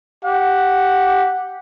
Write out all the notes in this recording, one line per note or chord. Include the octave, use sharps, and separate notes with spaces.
G4 F#5